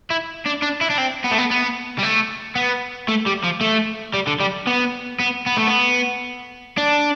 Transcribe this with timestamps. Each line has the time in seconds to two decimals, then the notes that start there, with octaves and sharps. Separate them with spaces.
0.10 E4
0.46 D4
0.62 D4
0.81 E4
0.90 D4
0.98 C4
1.24 B3
1.31 A3
1.39 B3
1.51 B3
1.98 G3
2.03 A3
2.55 B3
3.08 A3
3.26 G3
3.44 F3
3.61 A3
4.14 G3
4.27 D3
4.40 G3
4.67 B3
5.19 B3
5.46 B3
5.57 A3
5.67 B3
6.77 D4